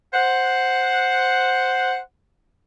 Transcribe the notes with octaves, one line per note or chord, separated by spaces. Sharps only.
C5 F#5